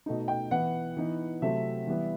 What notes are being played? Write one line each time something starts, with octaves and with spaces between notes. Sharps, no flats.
B2 A3 D#4
G5
E3 B3 E4 F#5
E3 B3 D#4
C3 F#3 A3 C4 E5
E3 G3 B3